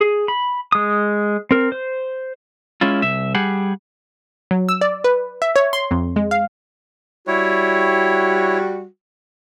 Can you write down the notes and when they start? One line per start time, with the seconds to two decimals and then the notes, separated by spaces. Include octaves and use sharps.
0.01 G#4
0.28 B5
0.72 G#3 D#6
1.51 C4 A#4
1.72 C5
2.81 G#3 C#4 E4 F4
3.02 C2 E5
3.35 G3 G4 G#4 F#5
4.51 F#3
4.69 E6
4.81 D5
5.04 B4
5.42 E5
5.56 C#5
5.73 C6
5.91 F2
6.16 G#3
6.31 F5
7.27 G3 E4 F#4 C#5